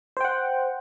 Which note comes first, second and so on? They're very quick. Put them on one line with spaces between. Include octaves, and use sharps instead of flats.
C5 G5 F#5